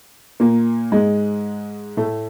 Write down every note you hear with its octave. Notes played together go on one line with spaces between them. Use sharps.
A#2 A#3
G#2 G#3
A2 A3